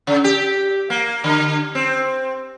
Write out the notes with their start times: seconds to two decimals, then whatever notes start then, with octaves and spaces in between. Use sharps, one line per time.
0.07 C#3
0.24 G4
0.90 A#3
1.24 D3
1.75 C4